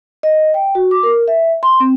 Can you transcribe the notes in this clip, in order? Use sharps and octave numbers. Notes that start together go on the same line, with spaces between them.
D#5
G5
F#4
D6
A#4
E5
C6
C4